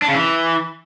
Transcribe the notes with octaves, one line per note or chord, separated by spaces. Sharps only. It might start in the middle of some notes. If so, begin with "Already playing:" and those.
D4
C#3
E3